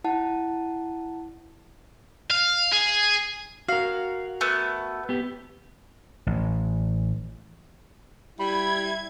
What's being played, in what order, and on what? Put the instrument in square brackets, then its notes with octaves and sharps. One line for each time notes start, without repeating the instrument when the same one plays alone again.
[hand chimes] E4 F#5 A5
[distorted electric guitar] F5
G#4
[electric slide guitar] F#4 A#4 [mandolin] F5
[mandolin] A3 B3
[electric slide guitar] B3 G4
[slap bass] A1
[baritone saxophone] G3 [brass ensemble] E4 [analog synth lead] B5 [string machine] G#6